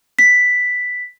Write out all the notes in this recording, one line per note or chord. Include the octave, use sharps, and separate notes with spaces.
B6